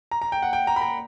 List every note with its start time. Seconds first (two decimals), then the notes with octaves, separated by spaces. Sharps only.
0.11 A#5
0.22 A#5
0.32 G5
0.42 F#5
0.53 G5
0.67 A#5
0.76 B5
0.81 A#5